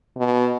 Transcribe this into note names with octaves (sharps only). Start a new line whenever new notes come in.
B2